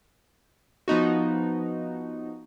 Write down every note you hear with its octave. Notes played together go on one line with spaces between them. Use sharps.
F3 B3 D#4 F#4